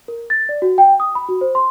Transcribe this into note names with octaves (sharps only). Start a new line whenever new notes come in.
A#4
A6
D5
F#4
G5
D#6
B5
F#4
C5
C6